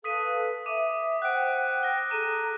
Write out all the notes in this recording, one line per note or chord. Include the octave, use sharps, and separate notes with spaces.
A4 B4 F5 D#6 B6 D#7
E5 D6 D#7
C5 F#5 G5 F#6 D7
F6 A#6
G#4 A4 A#5 D#7 E7